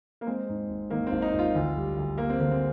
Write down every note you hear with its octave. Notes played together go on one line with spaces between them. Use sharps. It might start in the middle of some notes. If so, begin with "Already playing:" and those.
A#3
G#3 C4
G#2
G#1
D#3 A#3
C4
G#1
D#4
G#1
F4
D2
G3
D2
G3 A#3
C4
D3 A#3
C4